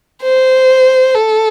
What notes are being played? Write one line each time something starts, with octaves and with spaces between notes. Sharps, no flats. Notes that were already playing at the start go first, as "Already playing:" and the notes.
C5
A4